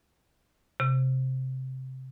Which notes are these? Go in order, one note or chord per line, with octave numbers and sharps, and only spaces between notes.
C3